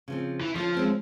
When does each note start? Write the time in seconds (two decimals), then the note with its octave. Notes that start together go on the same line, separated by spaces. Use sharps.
0.08 C#3 F3 C4
0.41 E3
0.56 D3 F3 C#4 F4
0.74 G#3 C4 C#4